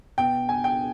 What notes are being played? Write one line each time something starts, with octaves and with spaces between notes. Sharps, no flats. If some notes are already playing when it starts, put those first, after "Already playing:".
B2 G5
G#5
G5